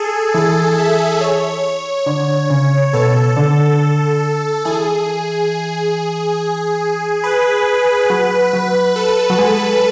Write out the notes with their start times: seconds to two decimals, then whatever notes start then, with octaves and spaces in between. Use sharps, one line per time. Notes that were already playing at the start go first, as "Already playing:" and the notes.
Already playing: G#4 A4
0.34 E3 A4
0.78 E5
1.21 C#5
2.06 D3
2.50 C#3
2.93 B2 A4
3.36 D3
4.65 E3 G#4
7.24 B4
8.10 F#3
8.53 F#3
8.96 A4
9.30 F#3
9.39 G#3